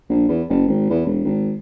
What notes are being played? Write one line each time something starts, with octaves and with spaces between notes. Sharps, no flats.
A#1
E2
F#1
G#1
E2
E1
G#1